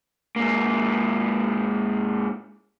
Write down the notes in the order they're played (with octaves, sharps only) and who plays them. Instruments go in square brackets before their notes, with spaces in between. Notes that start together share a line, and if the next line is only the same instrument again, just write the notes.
[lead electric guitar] G#2 A#3